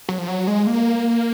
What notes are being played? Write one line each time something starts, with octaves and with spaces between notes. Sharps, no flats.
F#3
F3
F#3
G#3
A#3